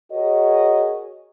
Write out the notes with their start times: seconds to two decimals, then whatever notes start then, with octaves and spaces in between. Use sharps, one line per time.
0.11 F#4 G#4 A#4 C#5 D#5